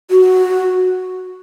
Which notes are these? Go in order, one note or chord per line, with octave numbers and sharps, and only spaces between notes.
F#4